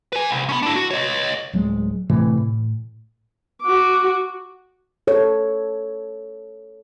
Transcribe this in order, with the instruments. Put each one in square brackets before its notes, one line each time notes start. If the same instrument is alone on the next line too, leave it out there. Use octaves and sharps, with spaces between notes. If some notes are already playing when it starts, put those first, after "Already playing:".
[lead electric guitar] B4 G#5
C2
B3 C#4
D4 E4
F#4
C#5 D#5
[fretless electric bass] D1 F#3 G#3
A2 C3 E3 A3
A2
[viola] F#4 D6
[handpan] A4 C#5